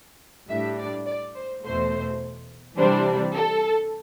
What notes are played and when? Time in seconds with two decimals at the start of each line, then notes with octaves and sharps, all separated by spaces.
0.49 A2 G3 D4 E5
0.79 D5
1.06 D5
1.35 C5
1.64 E2 B2 A3 C5
2.78 C3 E3 G3 D4 C5
3.34 A4